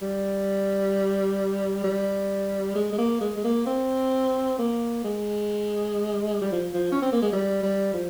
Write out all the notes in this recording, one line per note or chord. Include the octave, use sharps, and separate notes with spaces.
G3
G3
G#3
G#3
A#3
G#3
G#3
A#3
C4
A#3
G#3
G3
F3
F3
C#4
C4
A#3
G#3
G3
G3
F3